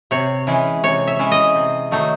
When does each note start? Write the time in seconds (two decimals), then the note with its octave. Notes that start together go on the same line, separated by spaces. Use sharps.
0.11 C3 C#5
0.47 E3 G#3 C#4
0.83 C3 C#5
1.07 E5
1.19 E3 G#3 C#4
1.32 D#5
1.55 C3
1.91 D#3 F#3 A3 D#4